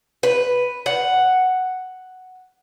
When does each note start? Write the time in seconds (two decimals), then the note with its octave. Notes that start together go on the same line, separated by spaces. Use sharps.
0.23 B4
0.86 F#5